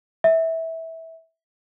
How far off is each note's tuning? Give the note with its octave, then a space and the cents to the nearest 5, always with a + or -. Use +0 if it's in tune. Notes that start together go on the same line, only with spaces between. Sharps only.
E5 -15